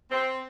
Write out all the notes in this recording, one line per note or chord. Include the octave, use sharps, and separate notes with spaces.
C4